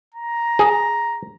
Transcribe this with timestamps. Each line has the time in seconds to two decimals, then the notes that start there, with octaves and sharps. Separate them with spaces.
0.14 A#5
0.59 G#4